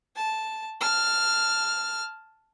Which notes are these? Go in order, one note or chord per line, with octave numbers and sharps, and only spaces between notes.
A5
A5 F6